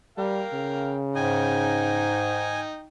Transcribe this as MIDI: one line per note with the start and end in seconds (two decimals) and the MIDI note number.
0.18 0.44 55
0.18 0.99 70
0.18 0.99 77
0.18 0.99 79
0.53 2.11 49
1.16 2.67 44
1.16 2.87 63
1.16 2.87 79
1.16 2.60 80